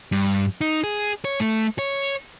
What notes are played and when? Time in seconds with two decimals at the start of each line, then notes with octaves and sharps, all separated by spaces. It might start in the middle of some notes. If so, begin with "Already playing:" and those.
0.12 G2
0.61 D#4
0.84 G#4
1.25 C#5
1.40 A3
1.79 C#5